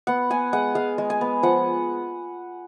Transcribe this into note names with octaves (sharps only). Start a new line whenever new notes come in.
B3 F#5
B3 G#5
G#3 F#5
G#3 F5
G#3
G#5
B3
F3 F#5